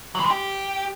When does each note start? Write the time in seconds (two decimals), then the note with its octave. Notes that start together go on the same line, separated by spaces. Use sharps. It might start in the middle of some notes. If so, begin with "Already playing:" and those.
0.15 F#3
0.20 E3
0.25 G#3
0.31 G4